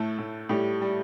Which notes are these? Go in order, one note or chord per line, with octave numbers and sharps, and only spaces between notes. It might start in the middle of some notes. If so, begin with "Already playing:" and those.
Already playing: A2 A3 A4
A2
A2 G3 G4
G3